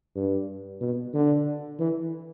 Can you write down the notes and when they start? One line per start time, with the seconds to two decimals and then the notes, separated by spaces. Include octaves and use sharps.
0.16 G2
0.81 B2
1.14 D3
1.79 E3